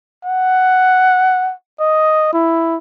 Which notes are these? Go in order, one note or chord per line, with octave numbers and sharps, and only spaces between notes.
F#5
D#5
E4